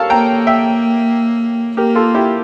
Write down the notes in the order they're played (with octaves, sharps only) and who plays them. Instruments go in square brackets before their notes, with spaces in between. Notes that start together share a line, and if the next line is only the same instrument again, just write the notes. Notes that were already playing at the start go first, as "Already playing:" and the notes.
Already playing: [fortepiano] A4 A#4 C#5 F5 A5
[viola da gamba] A#3 [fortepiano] G5 A#5
[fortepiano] E5 G5
[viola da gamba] A#3 [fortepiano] G4 A#4
[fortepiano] F4 A4
E4 G4